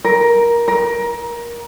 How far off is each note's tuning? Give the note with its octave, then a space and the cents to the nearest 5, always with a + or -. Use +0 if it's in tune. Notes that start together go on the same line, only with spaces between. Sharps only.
A#4 +15
A#4 +20